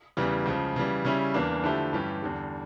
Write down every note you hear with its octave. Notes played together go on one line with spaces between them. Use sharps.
E2 C#3 E3 G3
C#2 C#3 F3
C#3 E3 G3
C#3 G3 C#4 E4
E2 E3 A#3 D4
D3 F3 A3 E4 G4
G2 E3 G3 C#4 G4
E2 D3 G3